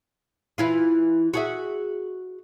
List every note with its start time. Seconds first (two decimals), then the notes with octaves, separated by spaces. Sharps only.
0.58 E3 E4 F4
1.34 F#4 G#4 E5